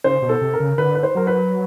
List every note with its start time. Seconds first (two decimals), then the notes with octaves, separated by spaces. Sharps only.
0.04 C#3 C5
0.22 B2
0.29 A4
0.41 C3
0.54 A#4
0.60 C#3
0.78 D3 B4
0.95 B4
1.03 C5
1.15 F#3 A#4
1.27 B4